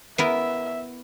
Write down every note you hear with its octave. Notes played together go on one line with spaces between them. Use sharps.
B3 E4 A#4 E5